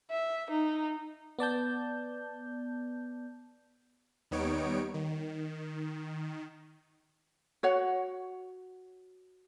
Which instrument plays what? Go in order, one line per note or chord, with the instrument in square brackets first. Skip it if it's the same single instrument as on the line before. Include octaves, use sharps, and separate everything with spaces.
[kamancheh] E5
D#4
[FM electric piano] B3 D5 A5 G6
[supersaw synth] D#2 G3 B3 D#4 C#5 D7
D#3
[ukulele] F#4 C#5 F#5